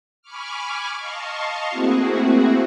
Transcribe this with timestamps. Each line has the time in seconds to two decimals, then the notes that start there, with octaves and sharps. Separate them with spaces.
0.22 G#5 B5 C#6 D6 F6
0.99 D#5 F5 A5 C6 C#6
1.69 A3 A#3 C4 E4 F#4 G#4